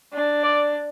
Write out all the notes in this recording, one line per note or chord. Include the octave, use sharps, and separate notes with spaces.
D4
D5